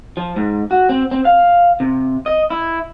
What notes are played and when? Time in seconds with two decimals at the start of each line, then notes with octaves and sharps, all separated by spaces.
0.17 F3
0.36 G#2
0.71 F#4
0.89 C4
1.11 C4
1.25 F5
1.80 C3
2.26 D#5
2.50 E4